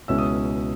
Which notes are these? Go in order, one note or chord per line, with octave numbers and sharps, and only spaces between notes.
C#2 B2 G#3 C#4 E4 E6
D#6